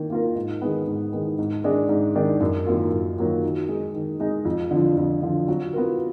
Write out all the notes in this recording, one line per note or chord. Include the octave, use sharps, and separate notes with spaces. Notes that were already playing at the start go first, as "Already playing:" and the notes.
Already playing: D#3 A#3
A#3 F4 A#4
G#2
D#3 G#3 B3
G#2
D#3 G#3 B3
G#2
D#3 G#3 D4
G#2
D#3 G#3 D4
F#2
D#3 F#3 A#3 F4
F#2
D#3 F#3 A#3 F4
D#3
G#3 D#4
D#3
G#3 D#4
F2
D3
F3
F2
D3 F3
F#3
B3 F4 A#4